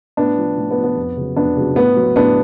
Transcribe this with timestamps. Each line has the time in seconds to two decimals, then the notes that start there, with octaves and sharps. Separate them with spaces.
0.17 A2 B3 D4
0.38 F3
0.57 A2
0.71 B3
0.77 F3
0.84 B3
0.97 F2
1.17 C#3 F#3
1.36 F2 B3 D4
1.56 C#3 F#3
1.76 A2 B3
1.96 F#3
2.16 A2 B3 D4